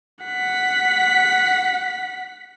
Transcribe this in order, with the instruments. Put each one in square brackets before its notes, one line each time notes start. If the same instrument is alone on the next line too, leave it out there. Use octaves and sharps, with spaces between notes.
[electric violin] F#5 B6